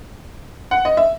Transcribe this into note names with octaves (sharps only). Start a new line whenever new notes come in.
F#5
D#5
E5